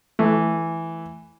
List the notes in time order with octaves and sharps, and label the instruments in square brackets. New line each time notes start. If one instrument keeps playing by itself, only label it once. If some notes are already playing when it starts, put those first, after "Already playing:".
[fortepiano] E3 [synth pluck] A3